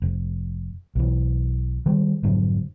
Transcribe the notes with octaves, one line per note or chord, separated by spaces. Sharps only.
F1
B1 E3
D#3 G3 G#3
F1 G#2 D3 F#3